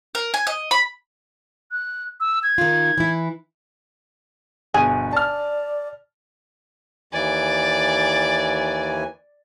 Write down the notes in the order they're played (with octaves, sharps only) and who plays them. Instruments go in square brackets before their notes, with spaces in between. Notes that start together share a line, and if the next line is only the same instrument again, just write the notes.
[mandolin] A#4
G#5
D#5
B5
[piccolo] F#6
E6
G#6
[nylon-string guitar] D#3 F4
E3 E4
[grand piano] G1 B2 D#7 [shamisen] G#4
[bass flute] D5 [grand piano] A5 F6
[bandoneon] D#2 E3 G#5 [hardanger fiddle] D5